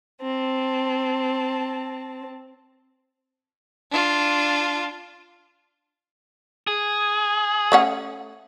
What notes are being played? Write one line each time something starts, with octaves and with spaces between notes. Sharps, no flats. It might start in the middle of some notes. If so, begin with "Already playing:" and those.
C4 A5
D4 F4
G#4
A3 C#4 F#5